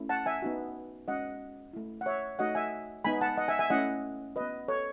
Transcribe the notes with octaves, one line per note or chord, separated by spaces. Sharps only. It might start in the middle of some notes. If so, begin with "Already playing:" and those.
Already playing: A3 C#4 E4
F#5 A5
E5 G#5
B3 D#4 F#4
G#3 C#4 F#4 D#5 F#5
A3 E4
F#5
C#5 E5
A3 D#4 F#4 D#5 F#5
E5 G#5
G#3 B3 D#4 G#5 B5
F#5 A5
D#5 F#5
E5 G#5
E5 G#5
A3 C#4 E4 D#5 F#5
B3 F#4 B4 D#5
A4 C#5